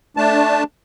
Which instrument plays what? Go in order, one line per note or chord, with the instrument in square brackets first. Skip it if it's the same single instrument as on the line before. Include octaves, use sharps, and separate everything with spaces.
[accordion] A3 D4 A5